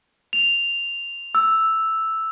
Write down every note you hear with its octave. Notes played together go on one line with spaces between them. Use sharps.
F7
E6